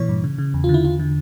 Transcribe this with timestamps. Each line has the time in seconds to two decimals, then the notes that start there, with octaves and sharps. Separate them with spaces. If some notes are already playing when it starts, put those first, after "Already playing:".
Already playing: A#2 E3 C#5
0.09 G2
0.24 C#3
0.38 C#3
0.54 E2
0.64 F4
0.69 D3
0.74 E4
0.84 E2 F4
0.99 D3